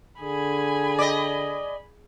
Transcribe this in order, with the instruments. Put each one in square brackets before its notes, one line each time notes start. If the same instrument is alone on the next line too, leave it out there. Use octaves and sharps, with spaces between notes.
[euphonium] D3 [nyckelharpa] G#4 [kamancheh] G#5 B5
[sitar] D5 D#5